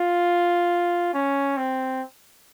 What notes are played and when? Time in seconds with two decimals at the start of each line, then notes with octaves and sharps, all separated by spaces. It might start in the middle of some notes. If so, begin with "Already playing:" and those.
Already playing: F4
1.14 C#4
1.57 C4